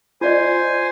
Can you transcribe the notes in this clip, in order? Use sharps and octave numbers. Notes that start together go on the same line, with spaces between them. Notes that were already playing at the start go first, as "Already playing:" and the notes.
F4 C5 D5 D#5 G#5